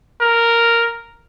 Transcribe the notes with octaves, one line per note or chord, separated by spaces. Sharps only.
A#4